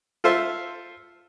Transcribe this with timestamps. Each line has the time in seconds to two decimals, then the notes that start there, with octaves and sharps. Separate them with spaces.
0.24 F4 A4 C5 E5